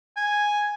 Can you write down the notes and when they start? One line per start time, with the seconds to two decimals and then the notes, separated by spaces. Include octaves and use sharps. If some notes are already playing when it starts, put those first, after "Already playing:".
0.17 G#5